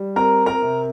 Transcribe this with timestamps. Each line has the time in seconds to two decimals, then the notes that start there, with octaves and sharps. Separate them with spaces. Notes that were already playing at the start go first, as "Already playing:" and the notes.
Already playing: G3
0.16 C4 A#4 A#5
0.46 A#4 A#5
0.62 C3